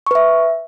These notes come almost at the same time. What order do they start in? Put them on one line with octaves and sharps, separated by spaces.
C#6 B4 E5